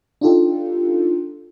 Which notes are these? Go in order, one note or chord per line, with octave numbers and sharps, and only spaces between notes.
D4 D#4 F4 G4 A4